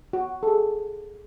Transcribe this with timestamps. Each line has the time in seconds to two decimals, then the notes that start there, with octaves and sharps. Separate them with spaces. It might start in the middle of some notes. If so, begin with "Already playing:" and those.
0.13 F#4
0.43 A4
0.47 G#4